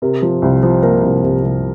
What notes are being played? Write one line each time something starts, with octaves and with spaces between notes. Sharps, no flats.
C3 A#4
F3
C2
F3
A#3 A#4
C2
C2
C2